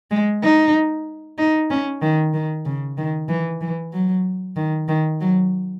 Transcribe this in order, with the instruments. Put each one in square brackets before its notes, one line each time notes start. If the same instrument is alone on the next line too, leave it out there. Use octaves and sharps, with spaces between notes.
[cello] G#3
D#4
D#4
C#4
D#3
D#3
C#3
D#3
E3
E3
F#3
D#3
D#3
F#3